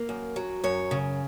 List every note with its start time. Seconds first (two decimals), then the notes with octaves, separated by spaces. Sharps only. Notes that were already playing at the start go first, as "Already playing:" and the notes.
Already playing: A#3
0.09 F#2
0.36 F#3
0.64 F#2 C#5
0.91 C#3